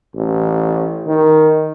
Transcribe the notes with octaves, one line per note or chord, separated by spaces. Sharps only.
A1
D#3